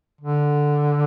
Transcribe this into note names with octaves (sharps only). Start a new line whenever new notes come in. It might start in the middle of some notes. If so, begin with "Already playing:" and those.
D3